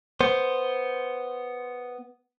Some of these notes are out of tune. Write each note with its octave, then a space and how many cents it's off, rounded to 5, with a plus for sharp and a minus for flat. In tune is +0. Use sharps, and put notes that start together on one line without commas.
B3 +0 C5 +0